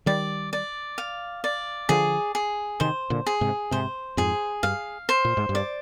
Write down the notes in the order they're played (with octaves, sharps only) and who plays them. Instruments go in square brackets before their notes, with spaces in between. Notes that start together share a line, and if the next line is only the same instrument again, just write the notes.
[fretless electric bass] D#3 G3 [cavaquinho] D5
[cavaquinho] D5
F5
D5
[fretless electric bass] D3 F3 [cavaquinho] G#4
[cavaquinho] G#4
[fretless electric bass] C3 D#3 [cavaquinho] C5
[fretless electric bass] A#2 D3
[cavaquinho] G#4
[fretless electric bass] G#2 C3
[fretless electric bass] G#2 C3 [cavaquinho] C5
[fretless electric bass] F2 G#2 [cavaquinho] G#4
[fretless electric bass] G2 [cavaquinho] F5
[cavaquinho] C5
[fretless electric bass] A#2
G#2
G2
[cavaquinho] D5